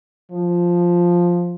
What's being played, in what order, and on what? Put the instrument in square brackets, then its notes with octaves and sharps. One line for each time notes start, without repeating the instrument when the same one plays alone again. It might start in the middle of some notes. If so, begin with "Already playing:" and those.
[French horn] F3